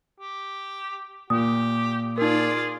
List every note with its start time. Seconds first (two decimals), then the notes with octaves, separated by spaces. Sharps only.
0.19 G4
1.30 A#2 G4 D#6
2.18 D#4 F4 G#4 A#4 D5